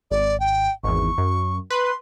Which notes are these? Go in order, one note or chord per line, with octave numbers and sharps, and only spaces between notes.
G#1 D5
G5
G#1 E2 C#6
F#2
B4 C6